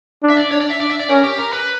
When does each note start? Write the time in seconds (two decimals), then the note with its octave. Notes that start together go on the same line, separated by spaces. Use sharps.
0.23 D4
0.30 E5
0.37 D5
0.51 D4 C#5
0.61 D5
0.70 E5
0.80 D4 D5
0.90 E5
0.99 D5
1.09 C#4 A#4
1.24 G4
1.39 A#4
1.53 B4